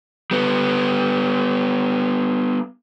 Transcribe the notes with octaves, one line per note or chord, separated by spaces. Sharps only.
G3 B3